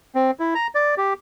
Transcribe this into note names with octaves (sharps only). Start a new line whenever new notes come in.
C4
E4
A#5
D5
G4